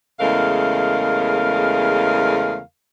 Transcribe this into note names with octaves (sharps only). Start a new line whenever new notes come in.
E2 C#3 G#3 A3 A#4 F5